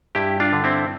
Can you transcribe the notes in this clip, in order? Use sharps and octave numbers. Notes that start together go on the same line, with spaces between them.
G2 E4 G4
D4 F4
D3
C4 E4